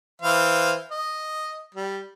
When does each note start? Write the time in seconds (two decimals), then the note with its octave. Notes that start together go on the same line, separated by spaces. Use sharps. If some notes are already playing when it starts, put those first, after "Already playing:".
0.22 E3 C5 F5
0.91 D#5
1.75 G3